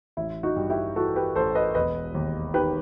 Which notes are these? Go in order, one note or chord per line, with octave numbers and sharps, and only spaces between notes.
A1 E4
D#4 F#4
G2
E4 G4
E3 F#4 A4
G4 B4
A1 A4 C5
B4 D#5
E1 B4 D#5
D#2
D#3 G4 B4